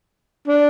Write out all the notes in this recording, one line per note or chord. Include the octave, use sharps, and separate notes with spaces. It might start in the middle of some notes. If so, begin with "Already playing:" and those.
D4